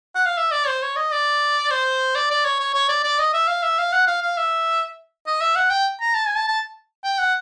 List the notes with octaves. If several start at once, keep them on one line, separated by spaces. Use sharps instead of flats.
F#5
F5
E5
D5
C5
C#5
D#5
D5
C5
D5
D5
C#5
C#5
C#5
D5
D5
D#5
E5
F5
E5
F5
F#5
F5
F5
E5
D#5
E5
F#5
G5
A#5
A5
G#5
A5
A5
G5
F#5